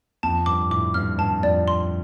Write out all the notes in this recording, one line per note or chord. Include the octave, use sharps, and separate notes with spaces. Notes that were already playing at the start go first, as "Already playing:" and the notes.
F2 A5
G2 D6
A2 D6
G2 F6
G2 A5
F2 D5
C6